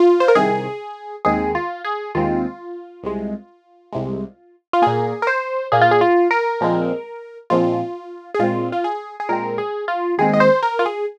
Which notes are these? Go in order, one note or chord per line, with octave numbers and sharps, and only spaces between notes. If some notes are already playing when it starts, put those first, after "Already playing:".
Already playing: F4
C5
A#4
C2 C3 D#3 G#4
D#2 D#3 G#3 C4 G#4
F4
G#4
D#2 D#3 G#3 C4 F4
C2 C3 G#3
C2 C3 G#3
F4
A#2 A#3 G#4
A#4
C5
A#2 A#3 G#4
F4
G#4
F4
A#4
A#2 F3 G#3 C4
A#2 F3 G#3 C4 F4
G#4
A#2 G#3 C4 F4
F4
G#4
G#4
A#2 G#3 C4 A#4
G#4
F4
D#2 D#3 G#3 C4 G#4
D#5
C5
A#4
F4
G#4